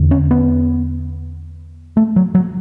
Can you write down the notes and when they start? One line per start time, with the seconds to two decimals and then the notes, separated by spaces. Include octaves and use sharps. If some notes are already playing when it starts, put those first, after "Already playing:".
Already playing: E2 D3
0.11 C#4
0.31 B3
1.97 A3
2.16 F#3
2.35 F#3